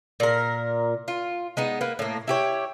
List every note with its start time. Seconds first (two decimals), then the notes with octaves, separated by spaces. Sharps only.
0.20 A#2 A#4
1.08 F4
1.57 G#3 B3 D#4
1.81 A#3 B4
1.99 A2 A#3
2.27 E4 G4 C#5